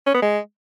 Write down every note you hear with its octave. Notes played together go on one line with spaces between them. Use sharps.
C#4
B3
G#3